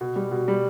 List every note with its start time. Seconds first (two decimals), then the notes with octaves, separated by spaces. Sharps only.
0.01 B2
0.16 G3
0.31 B2
0.48 G3